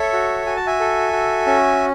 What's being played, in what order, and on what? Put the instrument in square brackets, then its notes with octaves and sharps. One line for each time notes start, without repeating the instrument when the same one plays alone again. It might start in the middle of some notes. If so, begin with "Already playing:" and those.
Already playing: [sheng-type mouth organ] A4 C#5 E5
F#4
F#4 G#5
A5
E5 G#5
A4
F#4
C#4